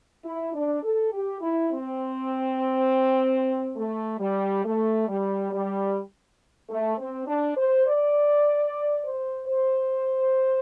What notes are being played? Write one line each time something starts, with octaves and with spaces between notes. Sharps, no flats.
E4
D4
A4
G4
E4
C4
A3
G3
A3
G3
G3
A3
C4
D4
C5
D5
C5
C5